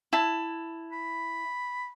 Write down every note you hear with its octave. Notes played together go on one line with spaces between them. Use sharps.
E4 A5
B5